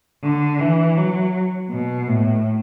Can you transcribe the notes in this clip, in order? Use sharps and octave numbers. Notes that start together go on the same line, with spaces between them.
D3
E3
F#3
B2
A2